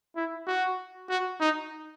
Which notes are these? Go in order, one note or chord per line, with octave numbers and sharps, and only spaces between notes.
E4
F#4
F#4
D#4